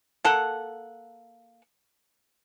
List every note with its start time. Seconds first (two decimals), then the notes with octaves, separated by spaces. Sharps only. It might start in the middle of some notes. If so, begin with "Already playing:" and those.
0.25 A#3 A4 F#5